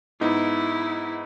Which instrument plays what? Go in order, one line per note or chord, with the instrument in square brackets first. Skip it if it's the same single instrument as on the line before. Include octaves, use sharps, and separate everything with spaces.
[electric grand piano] G#2 B3 D#4 [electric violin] E4